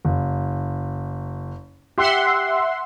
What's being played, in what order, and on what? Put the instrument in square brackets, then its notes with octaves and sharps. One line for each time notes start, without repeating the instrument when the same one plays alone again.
[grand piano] F#1
[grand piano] G4 [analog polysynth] E5 F#5 C6